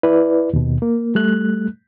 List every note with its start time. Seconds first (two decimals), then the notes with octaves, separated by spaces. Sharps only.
0.03 E4 B4 D5
0.53 D#2 B2
0.82 A#3
1.15 G3 A3 F#6